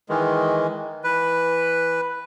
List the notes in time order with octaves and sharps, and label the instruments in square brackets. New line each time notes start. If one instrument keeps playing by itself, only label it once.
[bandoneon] D#3 E3 G#3
[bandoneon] E3 [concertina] B4